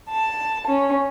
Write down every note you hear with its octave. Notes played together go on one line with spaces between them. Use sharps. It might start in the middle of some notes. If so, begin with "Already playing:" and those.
A5
C#4